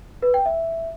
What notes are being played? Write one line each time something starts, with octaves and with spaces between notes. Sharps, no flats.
B4
G5
E5